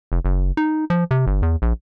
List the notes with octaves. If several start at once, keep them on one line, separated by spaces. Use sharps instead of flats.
F1
F#1
D#4
F3
C3
G1
E2
A#1